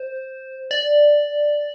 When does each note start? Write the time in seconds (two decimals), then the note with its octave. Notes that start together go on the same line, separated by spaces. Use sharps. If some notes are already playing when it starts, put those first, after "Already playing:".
Already playing: C5
0.71 D5